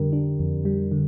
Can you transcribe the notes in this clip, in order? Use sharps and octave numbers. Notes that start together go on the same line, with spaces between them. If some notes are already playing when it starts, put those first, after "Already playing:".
Already playing: F2 D3 G3 D4 G4 A#4
D4
F2
G3
D3